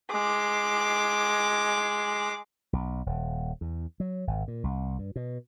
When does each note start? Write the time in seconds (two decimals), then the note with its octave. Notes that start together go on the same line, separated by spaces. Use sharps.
0.12 G#3 D6
2.73 B1
3.06 D#1
3.61 E2
4.00 F#3
4.27 G#1
4.48 A#2
4.64 C2
4.99 G2
5.16 B2